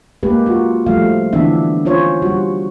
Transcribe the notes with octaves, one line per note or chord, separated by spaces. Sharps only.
G#3 A#3 G4 B4
F4 F#4
F3 G3 A3 F5
D3 E3 B3 D4 E5
C#4 F4 C5 C#5
G3 F#4